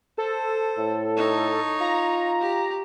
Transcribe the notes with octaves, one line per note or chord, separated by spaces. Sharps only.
A4 C5
A2
D#4 C#5
F4 A#5
G4